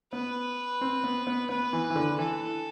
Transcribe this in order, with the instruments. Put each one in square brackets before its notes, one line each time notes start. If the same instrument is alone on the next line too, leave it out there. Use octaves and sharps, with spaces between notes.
[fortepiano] B3 [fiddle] B4
[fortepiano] C4
B3
B3
[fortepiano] B3 [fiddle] B4
[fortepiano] E3
E3
D3
[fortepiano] E3 [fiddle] A4